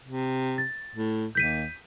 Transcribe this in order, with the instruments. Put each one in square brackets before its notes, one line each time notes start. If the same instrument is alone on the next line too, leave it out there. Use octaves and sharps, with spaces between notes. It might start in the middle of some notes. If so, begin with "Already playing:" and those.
[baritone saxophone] C3
[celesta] A6
[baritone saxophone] A2
[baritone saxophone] D#2 [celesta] G6 B6 D#7